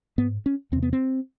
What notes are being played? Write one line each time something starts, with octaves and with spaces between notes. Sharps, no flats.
G#2 B3
C#4
E2 C3 C4
B3
C4